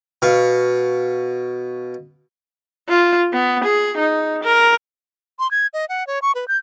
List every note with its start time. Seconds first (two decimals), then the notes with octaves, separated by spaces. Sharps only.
0.22 B2 F5 C#6
2.88 F4
3.33 B3
3.64 G#4
3.97 D#4
4.43 A#4
5.39 C6
5.51 G#6
5.73 D#5
5.89 F#5
6.07 C#5
6.22 C#6
6.35 B4
6.48 G6